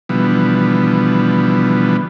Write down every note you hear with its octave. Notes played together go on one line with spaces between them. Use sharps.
B2 D3 E3 F3 G3 B3